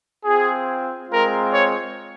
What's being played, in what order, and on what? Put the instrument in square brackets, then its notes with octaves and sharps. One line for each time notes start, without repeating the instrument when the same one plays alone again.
[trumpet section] C4 F4 G#4
G#3 C4 F4 A#4
C#5